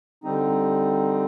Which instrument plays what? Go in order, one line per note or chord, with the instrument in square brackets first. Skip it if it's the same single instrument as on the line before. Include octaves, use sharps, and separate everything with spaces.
[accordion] D3 G3 C4 D#4